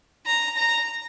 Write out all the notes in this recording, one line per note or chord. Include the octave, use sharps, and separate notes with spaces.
A#5
A#5